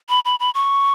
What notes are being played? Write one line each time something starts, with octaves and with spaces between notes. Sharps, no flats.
B5
B5
B5
C#6